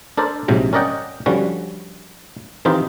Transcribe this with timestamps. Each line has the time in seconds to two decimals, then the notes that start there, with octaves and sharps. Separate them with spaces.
0.17 D4 A4 A#4 C5 D5
0.48 A#1 G#2 C3 F#3
0.73 C#4 A#4 D5 D#5 F#5 G5
1.26 D3 F3 G3 C#4 F#4
2.65 D#3 E3 C4 D#4 F4 G4